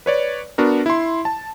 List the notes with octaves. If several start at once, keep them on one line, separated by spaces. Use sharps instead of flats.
B4 C#5 D5
B3 D4 F#4 A#4
E4 C6
A5